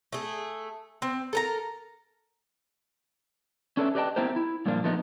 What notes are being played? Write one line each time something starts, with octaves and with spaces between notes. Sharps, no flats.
A3 G#4
C4
A4 A#4 A#5
C#4 D4 A4 B4 D5 E5
G4 B4 D5 D#5 G5 A5
B3 C4 E4 G4 A#4 C5
E4
G2 A#2 F3 A#3 D4
F3 A3 B3 D#4